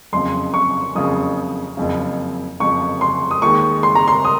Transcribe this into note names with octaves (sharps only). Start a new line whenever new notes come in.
F#1 F2 C#3 C6
C#6
F#1 F2 C#3 D#6
F#1 F2 C#3
F#1 F2 C#3 C#6
C6
D#6
D#2 D#3 G#3 C#6
C6
A#5
C6
D#6